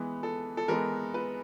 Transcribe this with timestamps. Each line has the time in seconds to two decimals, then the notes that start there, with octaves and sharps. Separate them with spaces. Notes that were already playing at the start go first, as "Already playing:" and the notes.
Already playing: E3 G#3 B3
0.23 A4
0.57 A4
0.68 E3 G#3 B3 A#4
1.14 B4